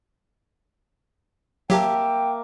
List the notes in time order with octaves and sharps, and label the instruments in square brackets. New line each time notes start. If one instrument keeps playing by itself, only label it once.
[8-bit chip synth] F#3 G4 [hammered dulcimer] A#3 E5 A5 [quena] G5